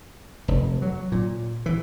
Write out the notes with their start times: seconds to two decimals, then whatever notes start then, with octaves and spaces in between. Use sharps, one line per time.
0.48 F1
0.82 F#3
1.12 A#2
1.66 E3